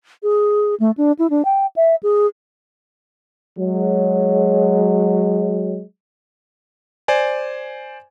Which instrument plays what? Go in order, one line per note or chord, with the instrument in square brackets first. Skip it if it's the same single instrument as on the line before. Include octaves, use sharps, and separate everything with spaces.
[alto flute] G#4
A3
D4
E4
D4
G5
E5
G#4
[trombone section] F#3 G#3
[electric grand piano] C5 D5 G#5